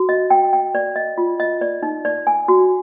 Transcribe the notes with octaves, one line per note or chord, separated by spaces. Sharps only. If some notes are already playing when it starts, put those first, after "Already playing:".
Already playing: F#4
D#5
G5
G5
D5
D#5
F4
D#5
D5
D#4
D5
G#5
F#4